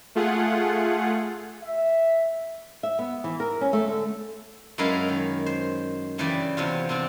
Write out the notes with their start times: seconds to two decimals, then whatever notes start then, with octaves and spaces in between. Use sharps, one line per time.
0.15 A3 F4 G#4 F#5
1.62 E5
2.83 E5
2.99 B3
3.24 E3
3.40 A#4
3.61 C#4
3.73 A3
3.88 D3
4.78 F#2 G#3 E4 A#4 B4 F5
5.08 D#3
5.46 C5
6.18 G2 C#3 E3 B4 D5 G5
6.57 E2 C3 F4
6.89 C3 C4 D4